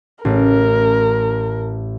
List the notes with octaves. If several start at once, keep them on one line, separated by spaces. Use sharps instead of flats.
A1 A#4